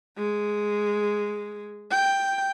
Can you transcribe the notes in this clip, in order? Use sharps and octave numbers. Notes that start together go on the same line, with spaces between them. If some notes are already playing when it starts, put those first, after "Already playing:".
G#3
G5